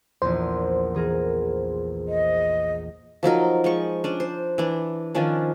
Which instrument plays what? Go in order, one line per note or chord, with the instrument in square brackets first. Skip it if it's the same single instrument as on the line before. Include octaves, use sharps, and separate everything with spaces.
[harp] A#1 E2 [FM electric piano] C5
[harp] E3 G#4 A#4
[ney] D#5
[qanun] F3 F#3 D#4 A#4
F3 G#3 C#6
C#4 D4
C5
E3 D4
D#3 F3 C#4 D4